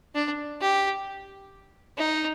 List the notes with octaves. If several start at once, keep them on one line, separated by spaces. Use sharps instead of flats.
D4
G4
D#4